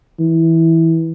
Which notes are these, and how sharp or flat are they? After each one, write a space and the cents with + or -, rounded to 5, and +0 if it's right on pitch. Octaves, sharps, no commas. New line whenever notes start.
E3 -15